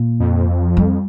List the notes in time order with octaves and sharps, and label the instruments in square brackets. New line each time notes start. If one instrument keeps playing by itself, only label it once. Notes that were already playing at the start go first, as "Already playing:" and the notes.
Already playing: [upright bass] A#2
[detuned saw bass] F2
[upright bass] G3